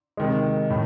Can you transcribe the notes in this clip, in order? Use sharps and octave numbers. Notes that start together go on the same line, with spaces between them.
C3 D#3 G#3
A2